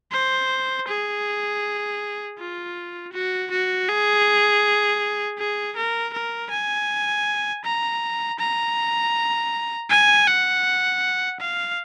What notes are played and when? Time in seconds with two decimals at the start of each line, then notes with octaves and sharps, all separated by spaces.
0.12 C5
0.88 G#4
2.38 F4
3.13 F#4
3.51 F#4
3.88 G#4
5.38 G#4
5.76 A#4
6.13 A#4
6.51 G#5
7.64 A#5
8.39 A#5
9.90 G#5
10.27 F#5
11.40 F5